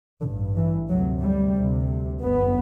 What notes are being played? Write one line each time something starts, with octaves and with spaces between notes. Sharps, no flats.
A1 G2 D3
E3
D2 C3 F#3
G3
D2 C3
G1 F#2 B3